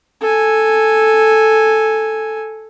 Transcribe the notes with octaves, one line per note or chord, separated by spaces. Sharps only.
A4 G#5